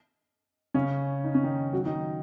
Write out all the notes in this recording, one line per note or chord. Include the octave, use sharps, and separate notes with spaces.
C#3 C#4
D#4
C#4
D#3 D#4
F#3 F#4
D#3 D#4